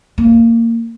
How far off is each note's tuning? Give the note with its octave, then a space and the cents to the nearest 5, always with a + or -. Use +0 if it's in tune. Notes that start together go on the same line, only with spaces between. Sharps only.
A#3 -20